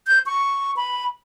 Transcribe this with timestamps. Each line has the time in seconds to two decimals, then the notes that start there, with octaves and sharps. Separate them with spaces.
0.07 G6
0.26 C#6
0.77 B5